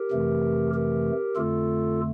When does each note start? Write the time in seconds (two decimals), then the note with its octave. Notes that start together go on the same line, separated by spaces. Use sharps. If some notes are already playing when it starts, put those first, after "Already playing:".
Already playing: G4 A#4
0.11 F2 C3 E3 A3
0.74 G4 A#4
1.35 F2 D3 A3 F4 A4